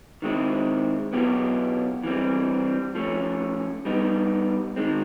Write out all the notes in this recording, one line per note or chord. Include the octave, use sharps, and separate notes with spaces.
D#3 G#3 C4 E4
B2 F#3 B3 E4 G4
E3 G3 C4
F3 A3 C#4
G3 B3 D#4
D#3 G#3 C4